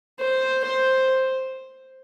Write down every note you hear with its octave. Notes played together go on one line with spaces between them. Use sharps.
C5
C5